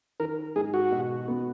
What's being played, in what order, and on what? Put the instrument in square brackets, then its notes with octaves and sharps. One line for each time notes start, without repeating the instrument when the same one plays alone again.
[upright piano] D#3 [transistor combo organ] A#4
[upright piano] G#2 [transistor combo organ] G#4
[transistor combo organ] F#4
[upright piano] B2
B3